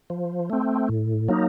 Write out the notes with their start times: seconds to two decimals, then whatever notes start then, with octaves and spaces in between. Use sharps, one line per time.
0.10 F3
0.50 A3 C4
0.89 A2
1.29 F#3 A#3 D#4